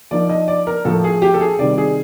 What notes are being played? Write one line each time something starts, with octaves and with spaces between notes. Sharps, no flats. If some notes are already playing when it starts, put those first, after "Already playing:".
F3 A#3 D#4 D5
D#5
D5
A#4
A2 F3 A#3 A4
G#4
G4
A4
G#4
C3 D#3 G3 D5
G#4